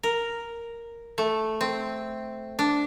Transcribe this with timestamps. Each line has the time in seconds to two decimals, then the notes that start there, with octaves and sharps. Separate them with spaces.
0.03 A#4
1.18 A3
1.61 C4
2.59 D4